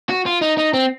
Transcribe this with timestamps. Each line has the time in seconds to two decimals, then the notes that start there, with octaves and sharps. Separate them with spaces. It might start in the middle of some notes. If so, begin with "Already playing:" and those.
0.09 F#4
0.26 F4
0.42 D#4
0.58 D#4
0.74 C4